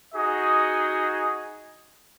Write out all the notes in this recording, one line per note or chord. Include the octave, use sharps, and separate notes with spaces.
D#4 F#4 G#4 D#5